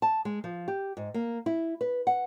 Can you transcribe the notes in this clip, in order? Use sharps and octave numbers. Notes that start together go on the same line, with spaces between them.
A5
G#3
F3
G4
G#2
A#3
E4
B4
F#5